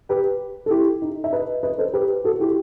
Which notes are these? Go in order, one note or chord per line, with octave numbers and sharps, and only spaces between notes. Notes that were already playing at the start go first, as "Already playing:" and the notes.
G4 B4
A4
E4 G4
D#4
E5
B4 D#5
B4 D#5
A4 C5
G4 B4
F#4 A4
E4 G4